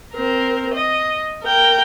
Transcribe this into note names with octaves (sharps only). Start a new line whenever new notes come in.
C4 A#4
D#5
A#4 G5